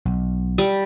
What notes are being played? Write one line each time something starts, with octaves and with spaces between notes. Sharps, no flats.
B1
G3